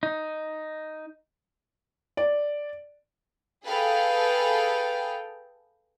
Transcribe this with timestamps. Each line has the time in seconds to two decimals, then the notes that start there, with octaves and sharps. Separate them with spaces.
0.03 D#4
2.17 D5
3.64 G#4 A4 B4 F5 G5